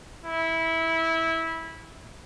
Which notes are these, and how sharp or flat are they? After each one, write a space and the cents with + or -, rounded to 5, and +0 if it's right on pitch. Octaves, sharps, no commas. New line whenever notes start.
E4 -15